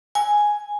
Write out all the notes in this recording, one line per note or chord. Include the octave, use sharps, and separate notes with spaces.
G#5